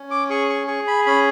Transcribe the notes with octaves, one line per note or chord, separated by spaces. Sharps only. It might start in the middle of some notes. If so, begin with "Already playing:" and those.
Already playing: C#4
D6
G#4 C#6
C#6
G#4 C#6
B5
C#4 B5